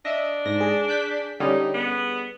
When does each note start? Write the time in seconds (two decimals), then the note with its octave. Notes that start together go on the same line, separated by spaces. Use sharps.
0.05 D4 D#5 E5
0.45 G#2 A#6
0.61 G#4
0.88 F#6 G6 B6
1.40 D3 G3 C#4 D#4
1.74 B3